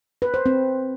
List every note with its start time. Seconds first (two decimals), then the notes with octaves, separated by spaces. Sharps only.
0.22 B4
0.34 C5
0.46 C4